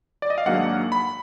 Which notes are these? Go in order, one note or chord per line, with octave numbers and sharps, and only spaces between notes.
D5
D#5
F5
G#1 G#2 F#3 A#3 D4 F#5
B5